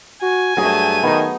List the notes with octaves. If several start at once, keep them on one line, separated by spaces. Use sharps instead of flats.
F#4 G#5
G2 F#3 A3 G#4 D#7
D#3 B3 D#4